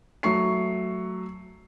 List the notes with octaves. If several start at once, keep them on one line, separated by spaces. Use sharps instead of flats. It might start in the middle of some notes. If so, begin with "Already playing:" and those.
F#3 A3 C#6 C7